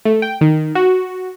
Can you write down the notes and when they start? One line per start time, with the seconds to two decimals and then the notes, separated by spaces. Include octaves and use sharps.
0.05 A3
0.22 G5
0.41 D#3
0.75 F#4